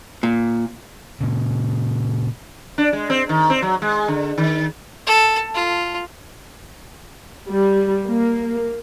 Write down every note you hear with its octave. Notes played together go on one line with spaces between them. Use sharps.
A#2
A#2 C#3
D4
G#3
C4
D#3
C4
F#3
G#3
D3
D#3
A4
F4
G3
A#3